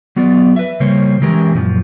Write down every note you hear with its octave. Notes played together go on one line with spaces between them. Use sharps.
F#3 B3 F4 G#4 D5
B4 E5
C#3 G3 A#3 C5 C#5
E3 G#3 C#4 G4 A#4
F#2 A#2 F3